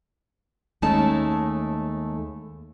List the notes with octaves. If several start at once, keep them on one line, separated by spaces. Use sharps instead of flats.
D#2 G#3 A3 C#4 D#4 A5